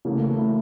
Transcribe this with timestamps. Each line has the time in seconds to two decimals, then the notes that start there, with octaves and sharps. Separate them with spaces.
0.05 C#3 E3 A3 A#3
0.27 A3
0.38 E4